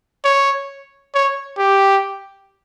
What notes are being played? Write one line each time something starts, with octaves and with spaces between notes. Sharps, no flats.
C#5
C#5
G4